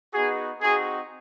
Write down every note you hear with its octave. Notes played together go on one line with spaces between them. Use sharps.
B3 D#4 F#4 G#4
C4 D#4 F#4 G#4